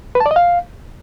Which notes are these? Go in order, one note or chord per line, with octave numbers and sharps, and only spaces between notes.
B4
A5
D5
D#5
F5